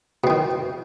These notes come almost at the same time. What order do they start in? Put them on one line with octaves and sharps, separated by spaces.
B2 C4 D#3